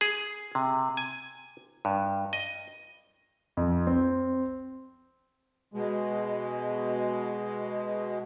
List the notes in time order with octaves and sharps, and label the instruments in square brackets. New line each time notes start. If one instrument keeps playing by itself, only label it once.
[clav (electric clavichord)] G#4
C3
G#5
G2
D#5
[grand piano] F2
C4
[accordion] B2 G#3